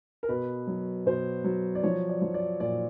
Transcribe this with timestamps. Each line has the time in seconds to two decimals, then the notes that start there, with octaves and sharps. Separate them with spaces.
0.23 A#4
0.29 B2 B4
0.67 F#3
1.06 B2 C5
1.44 F#3
1.75 D5
1.83 F3 C#5
2.09 D5
2.22 F3
2.34 D5
2.60 A#2 D5